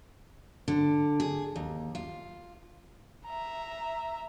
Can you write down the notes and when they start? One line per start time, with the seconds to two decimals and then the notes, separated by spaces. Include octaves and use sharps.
0.68 D3
1.20 G#4
1.56 D#2
1.95 F4
3.26 E5 A#5